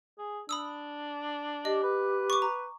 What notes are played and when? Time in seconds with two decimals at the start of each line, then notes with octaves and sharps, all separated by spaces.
0.18 G#4
0.49 D4 B5 D#6 E6
1.65 G4 D#5
1.83 B4
2.30 C#6 D6
2.42 A#5